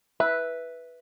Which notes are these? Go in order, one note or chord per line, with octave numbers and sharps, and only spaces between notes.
B4 E5